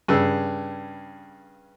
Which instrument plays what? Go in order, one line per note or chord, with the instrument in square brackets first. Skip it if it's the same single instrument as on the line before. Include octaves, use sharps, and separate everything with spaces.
[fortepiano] G2 C#3 E6